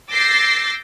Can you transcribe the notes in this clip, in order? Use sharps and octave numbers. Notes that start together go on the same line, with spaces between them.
D6 E6 G6 A6 A#6 C7